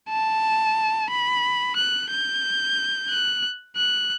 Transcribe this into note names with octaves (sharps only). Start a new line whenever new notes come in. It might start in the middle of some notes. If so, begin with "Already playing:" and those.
A5
B5
F#6
G6
F#6
F#6